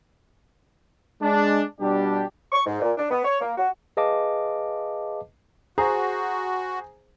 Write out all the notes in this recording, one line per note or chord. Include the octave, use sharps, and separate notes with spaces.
G#3 D4
B2 G3 D4 G4
C#6
G#2
A#2
D4
B3
C#5
A#3
F#4
G#4 B4 D#5 F5 A5 D6
F#4 G#4 C5 A#5